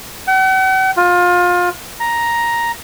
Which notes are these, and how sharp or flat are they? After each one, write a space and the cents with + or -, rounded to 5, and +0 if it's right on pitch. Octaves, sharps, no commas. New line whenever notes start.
F#5 +45
F4 +25
A#5 +5